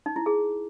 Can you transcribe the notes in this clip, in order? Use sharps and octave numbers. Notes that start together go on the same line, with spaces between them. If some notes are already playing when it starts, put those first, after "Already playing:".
D#4
E4
G#4